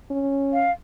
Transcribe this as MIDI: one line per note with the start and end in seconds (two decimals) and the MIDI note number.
0.11 0.68 61
0.53 0.71 77